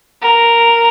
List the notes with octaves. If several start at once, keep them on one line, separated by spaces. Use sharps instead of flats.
A#4